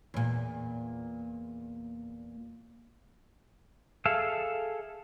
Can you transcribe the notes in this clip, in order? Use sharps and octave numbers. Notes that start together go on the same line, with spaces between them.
E2 A#2
G#4 A4 E5 F5